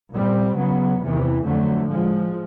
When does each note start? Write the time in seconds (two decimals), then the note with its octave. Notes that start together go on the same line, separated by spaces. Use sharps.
0.12 A#2 G3 C4
0.56 C#3 F#3 B3
1.01 E2 C3 E3
1.44 F2 D3 F#3 A3
1.88 A2 F3 G#3